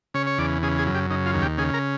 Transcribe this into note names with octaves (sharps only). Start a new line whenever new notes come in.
C#3 C#5
C#5
E2 D5
C#3 G#4
G#4
F#2
G4
C#3 D#4
F4
D#2
G4
C#3 G#4
A#4